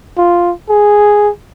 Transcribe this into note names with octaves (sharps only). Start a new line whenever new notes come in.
F4
G#4